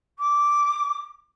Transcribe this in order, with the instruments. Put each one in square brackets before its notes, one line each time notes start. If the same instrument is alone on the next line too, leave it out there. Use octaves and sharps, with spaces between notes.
[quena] D6